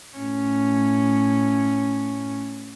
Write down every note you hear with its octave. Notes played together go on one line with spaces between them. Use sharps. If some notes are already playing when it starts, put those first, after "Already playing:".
A2 C#4